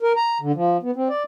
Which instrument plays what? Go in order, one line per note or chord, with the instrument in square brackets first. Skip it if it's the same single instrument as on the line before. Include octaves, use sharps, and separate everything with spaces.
[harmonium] A#4
A#5
D3
F3
B3
C4
D5